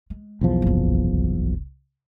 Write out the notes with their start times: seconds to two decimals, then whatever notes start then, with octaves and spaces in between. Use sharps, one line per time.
0.10 G#3
0.41 B1 E2 F3
0.62 F#1 C2